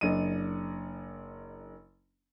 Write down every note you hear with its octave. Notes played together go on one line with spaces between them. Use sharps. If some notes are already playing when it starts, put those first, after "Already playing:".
F#1 D4 D#5 D#7